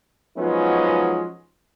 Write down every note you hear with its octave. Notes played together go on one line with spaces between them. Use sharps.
F3 F#3 G#3 B3 C#4 D#4